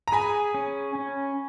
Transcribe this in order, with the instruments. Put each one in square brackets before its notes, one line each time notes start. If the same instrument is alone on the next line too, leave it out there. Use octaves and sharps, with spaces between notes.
[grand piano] A#5
[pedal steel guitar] G#4 [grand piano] G#5 B5
[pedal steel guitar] C#4
C#4